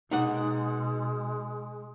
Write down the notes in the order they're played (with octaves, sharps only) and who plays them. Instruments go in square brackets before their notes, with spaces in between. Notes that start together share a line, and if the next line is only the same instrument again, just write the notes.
[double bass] B2 [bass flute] G#3 [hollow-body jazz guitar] D#4 F#5